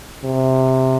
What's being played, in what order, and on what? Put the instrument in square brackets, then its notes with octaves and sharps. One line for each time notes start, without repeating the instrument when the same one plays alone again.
[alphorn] C3